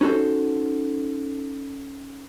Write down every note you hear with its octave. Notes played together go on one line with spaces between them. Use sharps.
C#4 D#4 F#4 A4 C5